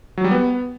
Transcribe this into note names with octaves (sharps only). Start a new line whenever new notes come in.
F#3
G3
B3